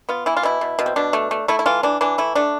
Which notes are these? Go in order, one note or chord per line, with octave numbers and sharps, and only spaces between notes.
B3 F4
E3 E4
F4
B2 E4
B2
B2
C4
B2 D4
A3
A3
A3 E4
E4
E3 F4
E3 D4
E3 D4
A3 E4
A3 D4